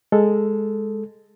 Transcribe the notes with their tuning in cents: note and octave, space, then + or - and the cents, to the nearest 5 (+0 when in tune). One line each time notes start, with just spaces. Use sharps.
G#3 +0 A4 +0